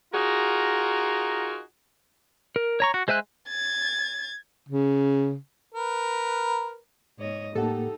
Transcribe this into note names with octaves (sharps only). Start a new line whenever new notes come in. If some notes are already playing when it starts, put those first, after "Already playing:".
D#4 F4 F#4 G#4 A#4
A#4
C#5 A#5 C#6
F#4
G#3 C5 E5 G#5 F#6
G#6 A6
C#3
A#4 B4
G#2 C#5 D#5
A2 A#3 D#4 G4 A4 F#5